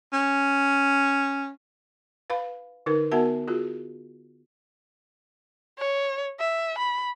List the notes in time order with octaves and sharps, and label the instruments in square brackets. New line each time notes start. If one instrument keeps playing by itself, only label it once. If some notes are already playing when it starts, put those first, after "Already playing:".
[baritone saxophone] C#4
[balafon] B4 F5 B5
D3 D#4 A#4 B4
B3 F#4 A#4 E5 F#5 A5
F4 F#4 G#4
[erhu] C#5
E5
B5